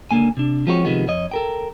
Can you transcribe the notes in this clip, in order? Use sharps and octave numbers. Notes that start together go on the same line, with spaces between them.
C#2 D3 A#3 G#5
C3 D4
F3 G#3 C4 F#4 A#4 C#5
C3 D#3 F3 G#3 B3
F2 C#5 D#5
A4 A#4 G5